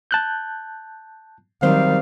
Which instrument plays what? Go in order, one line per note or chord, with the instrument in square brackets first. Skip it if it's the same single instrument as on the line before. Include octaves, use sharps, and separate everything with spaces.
[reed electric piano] A5 F#6 G6
[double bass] D#3 G3 [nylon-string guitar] F#3 C4 C5 [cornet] F5